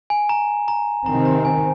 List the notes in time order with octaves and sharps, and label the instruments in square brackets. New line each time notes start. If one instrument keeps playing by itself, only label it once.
[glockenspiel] G#5
A#5
A#5
[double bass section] C3 D#3 C4 [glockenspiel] A#5
[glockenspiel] A#5
G#5